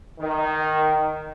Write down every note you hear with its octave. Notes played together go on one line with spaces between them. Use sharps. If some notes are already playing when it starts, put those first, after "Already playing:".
D#3